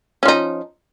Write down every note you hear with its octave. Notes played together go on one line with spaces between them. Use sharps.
F3 C#4 D#4